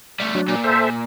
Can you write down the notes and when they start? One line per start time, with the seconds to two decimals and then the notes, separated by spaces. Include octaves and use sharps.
0.20 G3 A3
0.35 F#3 D4
0.48 A#2
0.64 A4 C5 E5